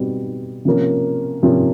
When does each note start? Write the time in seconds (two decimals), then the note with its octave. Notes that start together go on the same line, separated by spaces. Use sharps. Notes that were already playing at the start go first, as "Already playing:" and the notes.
Already playing: B2 G3 C4
0.65 C3 F3 A#3 C#4
1.43 C3 F3 A#3 C#4